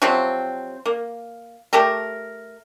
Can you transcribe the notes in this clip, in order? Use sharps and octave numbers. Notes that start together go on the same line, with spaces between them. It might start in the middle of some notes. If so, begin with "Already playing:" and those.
C3 F3 F#3 C4
A#3
A3 G4 A4 A#4